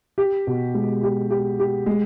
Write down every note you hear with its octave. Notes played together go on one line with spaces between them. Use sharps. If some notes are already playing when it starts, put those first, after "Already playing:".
G4
B2
G#3
G4
G4
G4
G#3